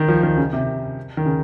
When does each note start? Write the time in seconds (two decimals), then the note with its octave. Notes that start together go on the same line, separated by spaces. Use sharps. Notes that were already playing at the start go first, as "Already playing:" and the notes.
Already playing: D#3
0.08 F3
0.23 D#3
0.37 C#3
0.53 C3
1.17 D#3
1.26 C#3